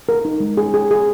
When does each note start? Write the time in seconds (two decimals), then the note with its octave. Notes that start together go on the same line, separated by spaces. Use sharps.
0.09 A#4
0.25 D#4
0.40 G#3
0.57 G#4
0.74 G#4
0.91 G#4